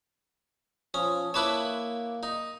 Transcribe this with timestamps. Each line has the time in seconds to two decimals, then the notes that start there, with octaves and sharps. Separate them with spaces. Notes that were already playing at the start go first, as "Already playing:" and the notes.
0.94 F3 C#4 D#6
1.34 A#3 E4 B4 C#5 A5 D6 F#6
2.23 D#4